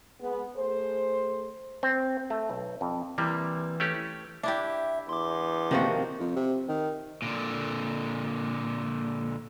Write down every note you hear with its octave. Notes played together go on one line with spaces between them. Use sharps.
G#3 B3
A3 G#4 C5
C4
A3
B1
F2
C3 E3 G3 A#3
A3 C#4 G4
D4 E4 G4 E5
E2 C6 D6
C3 D#3 F3 A#3 F#4
F2
C3
D#3
A#2 D3